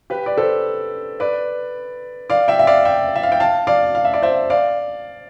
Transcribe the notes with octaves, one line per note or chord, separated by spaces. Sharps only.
G4 B4
D5
A4 C5
B4 D5
D5 F5
E5 G5
E5
D5 F5
E5 G5
E5
F5
G5
F5 A5
D5 F5
F5
E5
D5
C5 E5
D5 F5